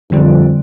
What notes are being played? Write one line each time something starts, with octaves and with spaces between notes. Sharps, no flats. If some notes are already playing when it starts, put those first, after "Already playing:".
F2 D3 G3 C4